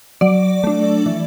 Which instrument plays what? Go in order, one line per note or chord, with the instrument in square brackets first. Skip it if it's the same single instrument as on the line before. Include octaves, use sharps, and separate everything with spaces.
[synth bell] F#3 D5
A3 D4
E3